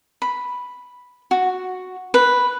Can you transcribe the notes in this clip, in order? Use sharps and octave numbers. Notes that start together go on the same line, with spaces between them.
B5
F#4
B4